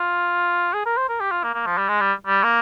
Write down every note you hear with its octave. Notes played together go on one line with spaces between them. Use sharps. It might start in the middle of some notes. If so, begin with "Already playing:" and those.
Already playing: F4
G#4
A#4
C5
A#4
G4
F4
A#3
A#3
F3
G3
G#3
G3
G3
A#3